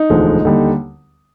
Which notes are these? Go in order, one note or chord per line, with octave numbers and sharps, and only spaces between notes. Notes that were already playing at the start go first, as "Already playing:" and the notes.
Already playing: D#4
E1 D2 D3 F3 G#3
D#2 D3 G3